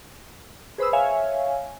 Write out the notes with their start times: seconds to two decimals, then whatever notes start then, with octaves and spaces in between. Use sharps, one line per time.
0.78 G#4 B4 C5 B5 D#6 E6
0.93 C#5 E5 F5 G#5